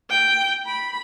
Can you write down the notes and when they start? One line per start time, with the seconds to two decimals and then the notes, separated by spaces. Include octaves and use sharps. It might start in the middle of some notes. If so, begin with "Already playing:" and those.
0.10 G5
0.65 B5